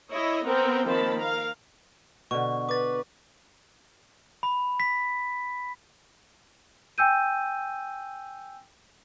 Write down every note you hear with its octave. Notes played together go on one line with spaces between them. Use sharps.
E4 C#5 D#5
B3 C4 A#4 G5
D#3 F3 A#3 C4 A5 B5
A#4 F5
B2 D3 C#6
B4 D6 A6
B5
B6
G5 G#5 E6 G6 D#7